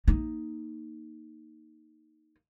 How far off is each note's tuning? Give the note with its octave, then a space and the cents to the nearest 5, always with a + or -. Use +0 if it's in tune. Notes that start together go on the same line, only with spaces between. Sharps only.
A#3 +0 D#4 +0